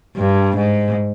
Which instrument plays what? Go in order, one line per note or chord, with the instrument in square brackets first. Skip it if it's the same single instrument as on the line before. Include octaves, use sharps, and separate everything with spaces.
[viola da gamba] G2
G#2